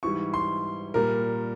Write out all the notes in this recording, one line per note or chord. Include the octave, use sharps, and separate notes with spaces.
G#2 E3 G3 C#6
C6
A#2 G3 A#4